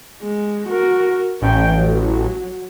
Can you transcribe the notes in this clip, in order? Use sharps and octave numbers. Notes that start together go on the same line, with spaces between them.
G#3
F#4 A#4
A1 C#4 G5
F#3